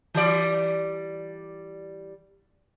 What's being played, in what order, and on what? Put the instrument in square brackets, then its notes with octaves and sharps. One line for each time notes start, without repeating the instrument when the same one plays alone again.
[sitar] E3 G3 D5